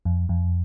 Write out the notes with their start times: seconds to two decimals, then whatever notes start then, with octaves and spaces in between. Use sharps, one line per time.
0.05 F2
0.29 F2